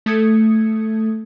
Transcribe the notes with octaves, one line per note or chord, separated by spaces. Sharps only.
A3 A4 D#6 G#6 C#7